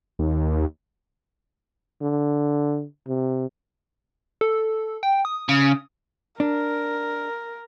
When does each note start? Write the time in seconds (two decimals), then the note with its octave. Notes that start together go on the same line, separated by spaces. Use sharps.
0.19 D#2
2.01 D3
3.07 C3
4.41 A4
5.03 G5
5.25 D#6
5.49 C#3
6.40 D4 A#4